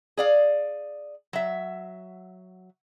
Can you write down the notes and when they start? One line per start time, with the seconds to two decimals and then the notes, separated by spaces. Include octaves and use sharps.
0.17 G#4 D5 F5
1.33 F#3 E5